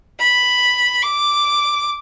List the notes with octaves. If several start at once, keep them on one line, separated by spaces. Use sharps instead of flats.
B5
D6